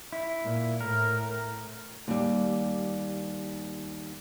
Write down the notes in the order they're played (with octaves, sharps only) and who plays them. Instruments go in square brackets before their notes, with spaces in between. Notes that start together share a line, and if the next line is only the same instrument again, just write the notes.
[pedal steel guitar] E4
[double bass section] A#2
[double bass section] A2 [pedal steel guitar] A#4
[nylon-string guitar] D#2 G3